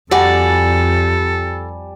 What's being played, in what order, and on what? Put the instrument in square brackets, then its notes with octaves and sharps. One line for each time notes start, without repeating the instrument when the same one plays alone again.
[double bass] F2 [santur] G3 G#5 A5 [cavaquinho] F#4 D5 [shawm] A4